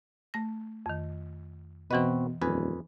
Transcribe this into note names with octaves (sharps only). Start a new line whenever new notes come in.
A3 A#6
F2 D#3
B2 E3 C4 F#4 B4 D#5
D#1 F2 B4 G#5